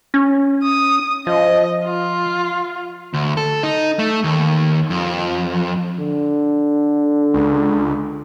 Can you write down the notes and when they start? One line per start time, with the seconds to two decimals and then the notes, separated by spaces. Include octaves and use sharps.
0.14 C#4
0.63 D#6
1.27 F3 D#5
1.85 F4
3.14 D2
3.37 A4
3.63 D#4
3.99 A3
4.24 D#2
4.90 F2
5.99 D3
7.34 C#2